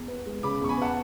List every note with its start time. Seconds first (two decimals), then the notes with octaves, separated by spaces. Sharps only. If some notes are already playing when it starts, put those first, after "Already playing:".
Already playing: E2
0.08 B3
0.26 G#3
0.43 C#3 B5 D6
0.61 E2 C#6
0.69 G#5 B5
0.78 B3 F#5 A5